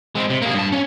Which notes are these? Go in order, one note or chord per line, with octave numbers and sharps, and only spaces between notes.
G#3 C4
C3
A#3 G#4
G2 A5
C#4